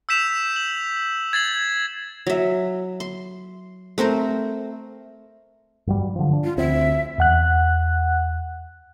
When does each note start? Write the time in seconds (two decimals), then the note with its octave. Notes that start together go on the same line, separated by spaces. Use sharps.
0.09 E6 G6 B6 E7 F7
0.56 F#7
1.33 G#6 A6 C7 F#7
2.27 F#3 E5
3.00 C6
3.98 A3 C4 A#4 C5
5.87 G2 F#3 G3
6.16 D3 F3
6.33 D4
6.44 F4
6.57 D2 C4 E5
7.18 E2 F#5 F#6